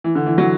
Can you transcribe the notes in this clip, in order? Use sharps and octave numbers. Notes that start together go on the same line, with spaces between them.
E3
D3
E3
F#3